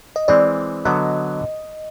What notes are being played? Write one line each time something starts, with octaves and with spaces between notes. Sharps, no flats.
D#5
E3 G#3 C4 D5
D3 F#3 B3 D#5